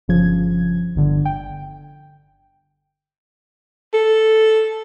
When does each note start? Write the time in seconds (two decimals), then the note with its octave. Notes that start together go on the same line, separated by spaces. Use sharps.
0.08 G1 C#3 F3 G#6
0.96 G1 D3
1.25 G5
3.94 A4